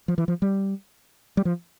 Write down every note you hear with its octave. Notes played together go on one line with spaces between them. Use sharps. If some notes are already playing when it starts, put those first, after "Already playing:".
F3
E3
F3
G3
G3
F3